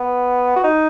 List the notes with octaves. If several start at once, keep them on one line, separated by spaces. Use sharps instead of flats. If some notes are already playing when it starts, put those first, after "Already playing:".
Already playing: B3
F#4
D#4